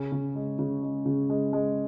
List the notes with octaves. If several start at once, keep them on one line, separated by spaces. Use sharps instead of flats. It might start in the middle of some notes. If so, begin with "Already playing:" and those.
Already playing: C#3 C#4
C#3
G#3
C#3
G#3
C#3
G#3
G#3